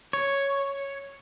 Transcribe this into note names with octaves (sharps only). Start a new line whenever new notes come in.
C#5